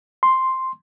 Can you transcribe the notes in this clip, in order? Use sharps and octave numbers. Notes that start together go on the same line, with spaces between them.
C6